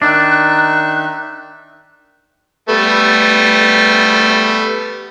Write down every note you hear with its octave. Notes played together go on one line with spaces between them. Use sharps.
D#3 D4 D#4 E5 F#6
G3 A3 B3